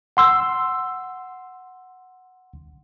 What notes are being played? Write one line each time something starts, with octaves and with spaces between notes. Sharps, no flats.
F#5 C6 E6